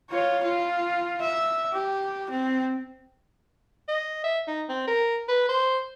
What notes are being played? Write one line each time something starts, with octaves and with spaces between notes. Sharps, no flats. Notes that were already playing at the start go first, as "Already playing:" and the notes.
F4 C#5
F4
E5
G4
C4
D#5
E5
D#4
C4
A#4
B4
C5